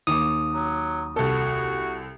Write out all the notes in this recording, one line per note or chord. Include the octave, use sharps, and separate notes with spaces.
D#2 D6 D#6
F#3
C2 F#4 A4